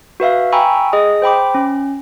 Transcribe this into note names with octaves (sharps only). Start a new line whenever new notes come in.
F#4 B4 E5 F5
G5 G#5 A#5 B5 C#6 E6
G#4 D#5 D#6
C5 G5 B5 D6
C#4